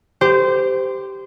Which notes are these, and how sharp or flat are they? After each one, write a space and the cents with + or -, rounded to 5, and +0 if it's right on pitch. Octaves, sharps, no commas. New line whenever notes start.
G4 +0 C5 -20